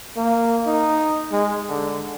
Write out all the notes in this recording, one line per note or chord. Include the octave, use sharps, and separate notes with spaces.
A#3
D#4
G#3
D3